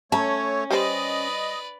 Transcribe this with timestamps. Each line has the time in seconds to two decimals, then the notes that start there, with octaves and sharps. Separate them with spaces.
0.12 A3 C#4 C#5 A5 A#5
0.71 G3 B4 C5 D5 D#5